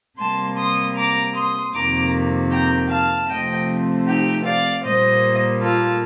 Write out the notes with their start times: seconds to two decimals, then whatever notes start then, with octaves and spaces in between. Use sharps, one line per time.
0.18 C3 G3 A#3 A5 C6
0.57 C6 D#6
0.96 A#5 D6
1.34 C6 D#6
1.73 F2 C3 D#3 A#3 A#5 D6
2.50 G5 A#5
2.89 F5 A5
3.28 C3 F3 A3 C4 D#5 G5
4.06 D#4 G4
4.45 D5 F5
4.83 A#2 G3 A#3 C5 D#5
5.60 F4 A4